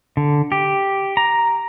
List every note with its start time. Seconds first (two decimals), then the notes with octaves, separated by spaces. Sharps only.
0.17 D3
0.52 G4
1.17 A#5